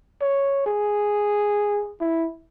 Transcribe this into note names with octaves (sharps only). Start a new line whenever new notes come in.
C#5
G#4
E4